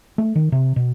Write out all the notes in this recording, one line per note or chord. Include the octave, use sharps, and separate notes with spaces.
A3
D#3
C3
B2